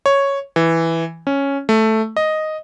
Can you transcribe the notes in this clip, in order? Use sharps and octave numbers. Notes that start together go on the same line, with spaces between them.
C#5
E3
C#4
A3
D#5